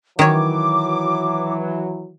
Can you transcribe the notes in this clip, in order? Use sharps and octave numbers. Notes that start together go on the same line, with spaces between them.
D#3 E3 F#3 C#5 D6